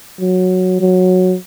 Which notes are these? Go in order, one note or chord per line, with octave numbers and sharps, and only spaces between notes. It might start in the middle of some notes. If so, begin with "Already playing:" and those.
F#3
F#3